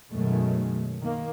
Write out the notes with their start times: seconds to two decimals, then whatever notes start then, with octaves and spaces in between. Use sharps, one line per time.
0.12 F#2 B2 D#3 F#3 G#3 A3
1.00 D#3 A#3